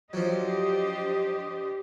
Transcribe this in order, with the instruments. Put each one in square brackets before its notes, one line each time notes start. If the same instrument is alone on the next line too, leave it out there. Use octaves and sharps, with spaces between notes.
[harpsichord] F3 F#3 [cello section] D4 G4 C5 [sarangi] D#5